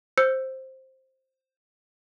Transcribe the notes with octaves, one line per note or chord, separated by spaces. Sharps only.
C5 E6 G6 C#7